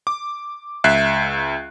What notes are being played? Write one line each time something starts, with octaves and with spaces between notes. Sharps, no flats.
D6
C#2 E5 F#6 C7